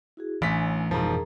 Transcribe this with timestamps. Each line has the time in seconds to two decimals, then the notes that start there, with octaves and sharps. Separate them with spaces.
0.17 E4 F#4 G#4
0.42 A1 E3 A3 D4 G#5 B6
0.91 F2 G#2 B2 E3 F3 G#4 A#4 A#5